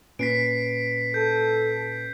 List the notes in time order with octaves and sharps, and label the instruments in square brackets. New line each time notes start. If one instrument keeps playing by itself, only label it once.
[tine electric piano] A#2 C#4 B4 [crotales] B6 C7 D7
[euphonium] A4 [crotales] G6